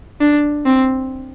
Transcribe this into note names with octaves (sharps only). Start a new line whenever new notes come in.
D4
C4